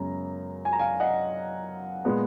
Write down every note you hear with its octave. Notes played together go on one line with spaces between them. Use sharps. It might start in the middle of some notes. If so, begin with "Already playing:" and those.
Already playing: F#2 C#3 G#3 B3 A#5
G#5
A#5
F5 G#5
D#5 F#5
A#2 G#3 B3